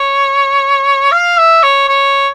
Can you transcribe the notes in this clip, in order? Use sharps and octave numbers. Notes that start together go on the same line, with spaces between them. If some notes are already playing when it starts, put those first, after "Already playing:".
Already playing: C#5
F5
E5
C#5
C#5